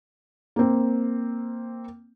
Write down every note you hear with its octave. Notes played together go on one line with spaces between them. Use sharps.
A#3 C4